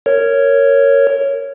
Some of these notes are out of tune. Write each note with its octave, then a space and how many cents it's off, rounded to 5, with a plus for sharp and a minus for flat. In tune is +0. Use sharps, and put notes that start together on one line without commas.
A#4 -15 C#5 +0